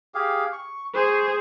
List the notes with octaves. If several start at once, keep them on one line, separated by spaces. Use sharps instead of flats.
G4 G#4 F5
C#6
G#4 C5 C#6